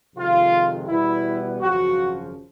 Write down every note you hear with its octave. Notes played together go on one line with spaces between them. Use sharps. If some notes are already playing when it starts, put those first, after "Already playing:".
F2 C3 D#3 G#3 F4
E2 B2 G3 B3 E4
G#1 F#2 C#3 F3 F#4